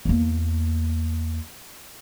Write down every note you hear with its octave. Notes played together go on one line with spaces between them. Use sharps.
E2 A#3